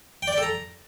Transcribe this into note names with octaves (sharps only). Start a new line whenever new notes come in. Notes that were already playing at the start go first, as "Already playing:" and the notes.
G5
D5
G5
A4
A#5